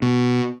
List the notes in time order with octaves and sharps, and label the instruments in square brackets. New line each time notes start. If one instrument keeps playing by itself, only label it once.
[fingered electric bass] B2